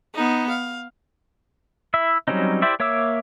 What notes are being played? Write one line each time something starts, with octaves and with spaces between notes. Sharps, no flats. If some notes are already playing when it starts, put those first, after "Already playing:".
B3 D#4
F5
E4 E5
F#3 G3 C4 C#4 D#4
E4 G4 C5 D5 E5
A#3 C#5 E5 D6 E6